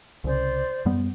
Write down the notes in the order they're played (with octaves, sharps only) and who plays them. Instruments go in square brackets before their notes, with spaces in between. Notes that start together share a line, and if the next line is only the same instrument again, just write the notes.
[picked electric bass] C2 C#3 [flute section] C5 D5
[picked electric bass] F#2 G3 B3